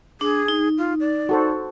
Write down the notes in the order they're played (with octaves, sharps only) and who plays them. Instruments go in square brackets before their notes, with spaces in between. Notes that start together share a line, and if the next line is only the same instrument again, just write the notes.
[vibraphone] D4 [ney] G#4
[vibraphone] D#4
[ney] F4
D5
[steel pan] F#4 A4 C5